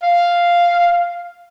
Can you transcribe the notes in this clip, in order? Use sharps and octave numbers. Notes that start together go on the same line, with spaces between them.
F5